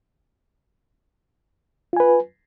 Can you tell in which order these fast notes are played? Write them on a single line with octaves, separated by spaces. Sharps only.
F4 G#5 B4